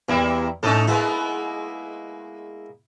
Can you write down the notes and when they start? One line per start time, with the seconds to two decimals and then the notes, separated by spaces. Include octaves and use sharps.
0.09 E2 G3 A#3 E4
0.63 A2 A3 C#4 D#4 A4
0.87 G#3 A#3 B3 E4